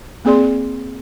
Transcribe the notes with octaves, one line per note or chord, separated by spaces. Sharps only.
A#3 C4 G#4 D5 C6